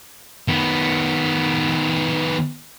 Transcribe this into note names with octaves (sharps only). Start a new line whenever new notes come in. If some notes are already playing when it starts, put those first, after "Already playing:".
D#3 B3